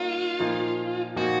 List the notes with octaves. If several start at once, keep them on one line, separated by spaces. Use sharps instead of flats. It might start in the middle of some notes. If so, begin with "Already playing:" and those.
Already playing: A#3 D#4 F4 A#4 C#5
A#2 F3 A#3 D#4
A#2 F3 A#3 D#4 F#4